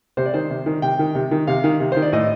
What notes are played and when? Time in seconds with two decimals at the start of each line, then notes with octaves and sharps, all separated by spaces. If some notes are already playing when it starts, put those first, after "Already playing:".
0.17 C3 C5
0.26 D5
0.34 D#3 C5
0.50 C3
0.66 D#3
0.82 C3 G5
0.99 D#3
1.15 C3
1.31 D#3
1.47 C3 F5
1.64 D#3
1.80 C3
1.92 D#3 C5
2.02 D5
2.12 A2 D#5